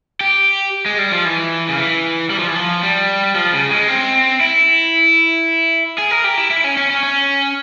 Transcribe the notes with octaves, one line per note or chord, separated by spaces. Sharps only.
G4
G#3
G3
F3
E3
C#3
E3
G3
F3
E3
F3
G3
F3
C#3
G#3
C4
E4
G#4
A#4
G4
E4
E4
C#4
C#4
C#4
C#4